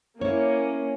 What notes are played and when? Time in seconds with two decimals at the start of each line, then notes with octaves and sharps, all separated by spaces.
0.21 A#3 C#4 E4 C#5